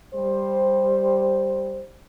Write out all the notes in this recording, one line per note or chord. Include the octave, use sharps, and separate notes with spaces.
G3 C5